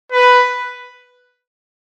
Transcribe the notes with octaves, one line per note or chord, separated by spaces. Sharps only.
B4